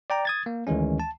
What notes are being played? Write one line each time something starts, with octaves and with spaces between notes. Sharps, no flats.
D5 G5 A#5
D#6 G#6 A6
A#3
D2 D#3 E3 G#3 C#4
A5